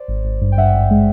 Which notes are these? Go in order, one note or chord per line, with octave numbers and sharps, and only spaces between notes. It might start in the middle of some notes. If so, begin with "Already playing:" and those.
Already playing: C5 D5
G#1
G#1
G2
G5
G2 E5 F#5
G#1
G#3